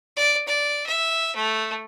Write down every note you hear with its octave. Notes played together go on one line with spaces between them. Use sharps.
D5
D5
E5
A3